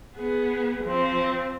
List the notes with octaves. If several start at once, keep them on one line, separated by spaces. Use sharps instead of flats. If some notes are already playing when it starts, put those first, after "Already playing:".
B3 G#4
F3 C4